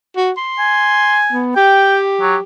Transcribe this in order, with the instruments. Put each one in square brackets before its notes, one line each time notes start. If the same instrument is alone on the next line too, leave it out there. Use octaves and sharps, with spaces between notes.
[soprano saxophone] F#4
C6
[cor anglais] G#5
[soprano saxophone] B3
[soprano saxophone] G4 [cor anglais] G5
[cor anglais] F#3